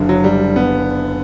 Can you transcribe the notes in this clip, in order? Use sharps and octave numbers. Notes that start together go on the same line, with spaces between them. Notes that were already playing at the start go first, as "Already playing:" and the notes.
Already playing: F#1 F#2 D3
F#3
G3
B3